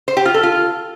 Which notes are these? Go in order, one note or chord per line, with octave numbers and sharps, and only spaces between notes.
C5
G4
F4
A4
F4